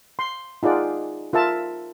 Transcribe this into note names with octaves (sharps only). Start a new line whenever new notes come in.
C6
D#4 F4 G#4 D5 F#5
F4 A#4 E5 A5